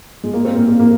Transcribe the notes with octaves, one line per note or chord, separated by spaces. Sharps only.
G#3
A#3
C4
A#3
A#3
A#3